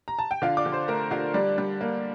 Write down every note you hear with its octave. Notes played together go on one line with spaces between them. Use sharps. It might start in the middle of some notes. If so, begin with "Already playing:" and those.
A#5
A5
G5
D3 F4 F5
D5 D6
D3
C5 C6
A3 A#4 A#5
D3 F4 F5
G3 D4 D5
G3
A#3